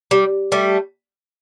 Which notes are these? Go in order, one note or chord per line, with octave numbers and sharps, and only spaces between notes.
G3
G3 A3